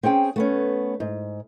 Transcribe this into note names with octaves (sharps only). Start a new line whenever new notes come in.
C4 C#4 G#4 G5
A3 B3 C#4
G#2